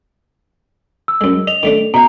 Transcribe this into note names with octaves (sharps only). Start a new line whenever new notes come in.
E6
F#2 G#3
D#5 F7
D#3 A3 D4
B2 E5 A#5